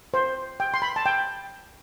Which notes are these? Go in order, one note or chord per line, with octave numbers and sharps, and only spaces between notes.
C5
G5
C6
B5
A5
G5